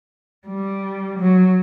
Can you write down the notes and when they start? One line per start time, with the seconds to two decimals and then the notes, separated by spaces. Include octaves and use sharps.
0.47 G3
1.19 F#3